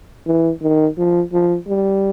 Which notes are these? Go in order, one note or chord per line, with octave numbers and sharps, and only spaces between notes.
E3
D#3
F3
F3
G3